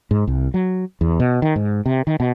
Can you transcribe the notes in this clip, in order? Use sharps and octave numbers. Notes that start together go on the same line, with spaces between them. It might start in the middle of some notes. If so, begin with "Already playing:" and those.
G#2
C2
F#3
E2
B2
D#3
G#2
C3
D#3
B2